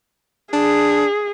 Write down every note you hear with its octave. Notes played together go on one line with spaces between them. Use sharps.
D4 G#4